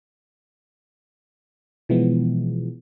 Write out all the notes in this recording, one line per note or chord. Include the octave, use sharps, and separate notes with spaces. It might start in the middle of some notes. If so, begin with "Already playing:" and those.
B2 E3 F3 G#3 B3